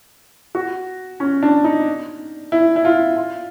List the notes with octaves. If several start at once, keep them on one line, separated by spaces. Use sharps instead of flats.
F#4
C#4
D4
D#4
E4
E4
F4
F4